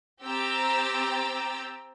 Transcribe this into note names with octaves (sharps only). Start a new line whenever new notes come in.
C4 G4 G5 A#5 E6 A6